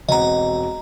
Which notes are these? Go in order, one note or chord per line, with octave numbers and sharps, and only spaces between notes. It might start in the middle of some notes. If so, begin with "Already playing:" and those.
E1 C4 D#5 F#5 A#5